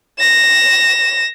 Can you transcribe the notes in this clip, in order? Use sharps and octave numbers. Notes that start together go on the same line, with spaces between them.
A#6 E7